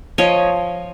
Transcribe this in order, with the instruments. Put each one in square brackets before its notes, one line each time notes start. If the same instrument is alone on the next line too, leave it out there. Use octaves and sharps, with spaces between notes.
[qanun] F3 C#5 D#5